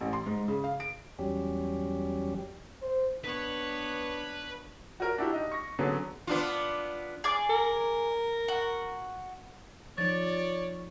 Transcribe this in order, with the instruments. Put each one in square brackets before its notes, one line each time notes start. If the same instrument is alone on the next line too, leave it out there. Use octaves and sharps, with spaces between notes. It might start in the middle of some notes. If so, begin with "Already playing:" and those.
[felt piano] A1
C6
G#2
C#3
F5
D7
[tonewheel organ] E2 F#3 G3 C#4 G4
[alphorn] C5
[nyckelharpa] B3 C#5 [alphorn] D4 [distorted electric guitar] B4
[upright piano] F#4 A#4
D4 E4 F#4 G4
D#4
C#6 A#6
D3 F#3 B3 C#4 G#4
[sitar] B3 D4 F4
[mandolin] G#4 D5 D6
[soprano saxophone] A#4
[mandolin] F#4
[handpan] F3 D#4 [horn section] C#5 D5 [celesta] A6